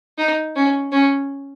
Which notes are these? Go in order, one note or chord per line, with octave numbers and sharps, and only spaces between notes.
D#4
C#4
C#4